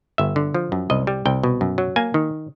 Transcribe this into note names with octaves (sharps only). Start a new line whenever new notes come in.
G1 E5
D3
F3
F#2
C2 D#5
G3
C2 G5
B2
F#2
F#3
A#3 G#5
D#3